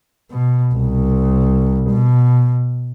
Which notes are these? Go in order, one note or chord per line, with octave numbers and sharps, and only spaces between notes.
B2
C2
B2